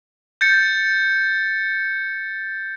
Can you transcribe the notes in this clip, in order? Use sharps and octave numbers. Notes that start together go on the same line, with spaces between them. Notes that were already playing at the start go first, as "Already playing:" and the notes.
G6 A6 C#7